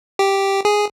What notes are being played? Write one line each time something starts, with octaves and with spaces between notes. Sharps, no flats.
G4
G#4